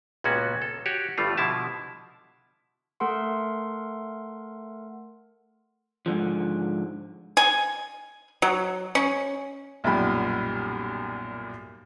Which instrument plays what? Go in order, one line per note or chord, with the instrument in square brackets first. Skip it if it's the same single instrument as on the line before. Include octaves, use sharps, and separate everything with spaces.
[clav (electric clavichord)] C#2 A#2 B3 C#4 F#4
A4
F#4 G4 C#5
G1 G2 G3 A3 F4
B2 D3 F3 E4 E5 A5
[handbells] A3 A4 A#4 F#5 C6
[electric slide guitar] G#2 B2 D3 F3
[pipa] G#5
F#3
C#4
[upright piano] B1 F#2 A#2 G3 G4 B5